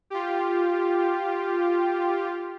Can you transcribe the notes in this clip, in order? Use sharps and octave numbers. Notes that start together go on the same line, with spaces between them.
F4 G4